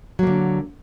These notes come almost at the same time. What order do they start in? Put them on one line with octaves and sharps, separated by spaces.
F#3 A#3 D3